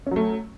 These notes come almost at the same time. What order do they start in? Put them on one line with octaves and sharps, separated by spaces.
C#4 F#3 A3